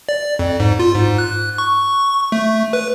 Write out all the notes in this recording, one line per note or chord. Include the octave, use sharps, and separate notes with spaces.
D5
F2
G#2
F4
G#2
F#6
C#6
A3
B4